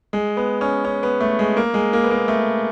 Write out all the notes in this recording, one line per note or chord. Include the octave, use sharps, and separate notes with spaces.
G#3
B3
C#4
C#4
B3
A3
G#3
A#3
G#3
A#3
B3
A#3
A3